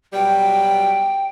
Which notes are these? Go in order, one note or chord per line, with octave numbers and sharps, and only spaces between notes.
B2 F#3 G3 G5